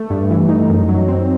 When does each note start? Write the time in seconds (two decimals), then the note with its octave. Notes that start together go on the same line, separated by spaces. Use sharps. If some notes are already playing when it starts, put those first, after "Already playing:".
Already playing: A3
0.10 G2
0.31 E3
0.49 D#4
0.70 F#2
0.89 F#3
1.08 C4